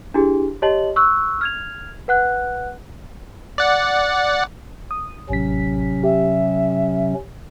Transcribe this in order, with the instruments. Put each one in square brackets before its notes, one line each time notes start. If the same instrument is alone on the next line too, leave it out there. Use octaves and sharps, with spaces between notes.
[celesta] D4 E4 G4 G#4
G4 C#5 D#5 A5 F#7
C#6 E6 F#6
F6 G#6 F7
B4 F#5 F#6
[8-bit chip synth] D5 F#5
[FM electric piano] D#6
[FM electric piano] A1 B6 [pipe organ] C3 F#3 C#4
[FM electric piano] G4 [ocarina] E5